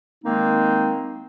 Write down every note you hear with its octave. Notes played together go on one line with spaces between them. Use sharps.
D#3 G#3 A#3 C4 D#4